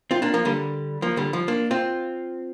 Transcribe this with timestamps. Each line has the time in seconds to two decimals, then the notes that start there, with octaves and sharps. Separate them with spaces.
0.11 C4 F4
0.22 A#3 D4
0.34 F3 A#3
0.45 D3 G3
1.02 F3 A#3
1.17 D3 G3
1.33 F3
1.48 A#3 D4
1.71 C4 F4